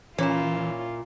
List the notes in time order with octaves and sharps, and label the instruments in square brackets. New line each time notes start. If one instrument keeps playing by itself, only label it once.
[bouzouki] A#2 E4 [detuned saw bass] E3 [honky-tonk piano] C#4 [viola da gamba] F4